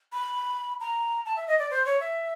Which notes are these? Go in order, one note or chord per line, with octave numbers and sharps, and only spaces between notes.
B5
A#5
A5
E5
D#5
D5
C5
C#5
E5